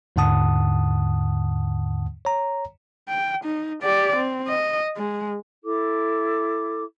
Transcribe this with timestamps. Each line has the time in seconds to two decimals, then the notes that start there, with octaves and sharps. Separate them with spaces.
0.16 D#2 G#2 D3 F#5 A5 D#6
2.25 C#5 A#5
3.09 G5
3.44 D#4
3.82 G4 D5
4.16 C4
4.48 D#5
4.97 G#3
5.63 E4 A4 D6